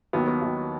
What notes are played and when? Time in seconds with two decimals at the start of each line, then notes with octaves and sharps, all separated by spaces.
0.13 D#2 D#3 F#3 B3
0.28 B3
0.42 D#2 D#3 F#3